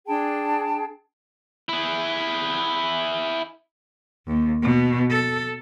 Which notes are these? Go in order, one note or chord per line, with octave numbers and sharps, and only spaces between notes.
D4 G#4 G5 A5
E4 G#4
D#2
B2
A4